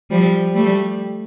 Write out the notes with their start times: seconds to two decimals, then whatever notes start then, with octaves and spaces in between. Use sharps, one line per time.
0.11 F3 G3
0.55 G3 A3